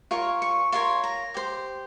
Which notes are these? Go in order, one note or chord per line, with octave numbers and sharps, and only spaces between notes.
F4 A#4 C#5 C#6
C#6
F4 A#4 C#5 C6
A#5
G4 C5